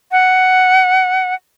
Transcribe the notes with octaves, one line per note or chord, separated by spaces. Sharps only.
F#5